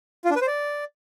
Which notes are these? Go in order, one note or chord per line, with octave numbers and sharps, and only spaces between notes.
F4
D4
B4
C5
D5